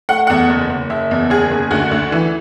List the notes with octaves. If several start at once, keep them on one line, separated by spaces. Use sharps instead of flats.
A3 F#5
E2 F#5
F#1
F#1
F#1 E5
E2
F#1 G#4
F#1
D2 F#4
D2
E3